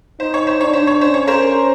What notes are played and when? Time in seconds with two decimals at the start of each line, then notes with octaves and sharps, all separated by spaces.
0.20 D#4 C5
0.34 C#5
0.47 C5
0.61 D4 C#5
0.73 C5
0.87 C#5
1.01 C#4 C5
1.14 C#5
1.27 A#4 C5